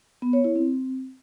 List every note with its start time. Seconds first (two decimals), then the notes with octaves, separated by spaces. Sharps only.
0.22 B3
0.33 C#5
0.44 E4
0.55 C4